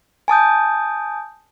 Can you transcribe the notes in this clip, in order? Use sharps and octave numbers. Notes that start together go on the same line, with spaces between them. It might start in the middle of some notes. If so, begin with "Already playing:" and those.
G#5 A5 D#6 G6